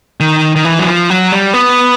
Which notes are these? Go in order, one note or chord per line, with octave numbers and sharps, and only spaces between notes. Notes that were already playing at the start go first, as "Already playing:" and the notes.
D#3
D#3
E3
F#3
F3
F#3
G3
B3